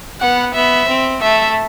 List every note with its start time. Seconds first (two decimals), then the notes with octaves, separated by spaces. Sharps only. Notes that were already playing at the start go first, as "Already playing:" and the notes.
0.21 B3 F#5
0.54 B3 E5
0.88 C4
1.21 A3 E5